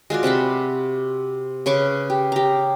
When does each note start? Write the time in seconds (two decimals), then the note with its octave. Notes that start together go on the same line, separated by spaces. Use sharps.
0.10 G#3 F4 F#4 D5
0.23 C3 F#5 A5 B5
1.66 C#3 B4 C#6 D6
2.10 G4
2.32 G4 A#5